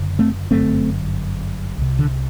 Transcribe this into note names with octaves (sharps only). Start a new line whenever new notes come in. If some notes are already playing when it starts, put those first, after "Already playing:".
Already playing: F#1 F#2 D3
A3 C4
G1 F#2 D3 A3 C4
C2 C3
D3